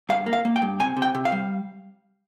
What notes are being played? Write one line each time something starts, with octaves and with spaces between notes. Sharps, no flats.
G2 F5
A#3
F5
A#3
G5
G2
C3 G#5
C3
G5
C3
F5
G3